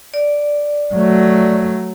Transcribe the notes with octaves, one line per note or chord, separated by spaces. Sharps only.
D5
F#3 A3